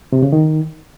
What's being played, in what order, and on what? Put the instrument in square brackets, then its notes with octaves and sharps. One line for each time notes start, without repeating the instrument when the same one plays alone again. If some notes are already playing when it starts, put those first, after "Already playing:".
[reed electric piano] C3
C#3
D#3